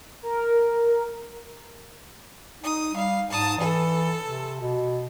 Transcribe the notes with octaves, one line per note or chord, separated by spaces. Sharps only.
A#4
D#4 D#6
G3 F5
G#2 A5 D#6
E3 A4
C3
B2